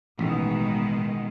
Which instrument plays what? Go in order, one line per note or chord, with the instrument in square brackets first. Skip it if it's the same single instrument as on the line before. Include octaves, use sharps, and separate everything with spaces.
[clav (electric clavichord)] A1 [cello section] B2 D#3 G#3